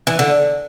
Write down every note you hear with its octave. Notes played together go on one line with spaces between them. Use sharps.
E3
D3